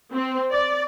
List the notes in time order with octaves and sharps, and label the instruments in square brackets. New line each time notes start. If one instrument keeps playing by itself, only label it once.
[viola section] C4
D5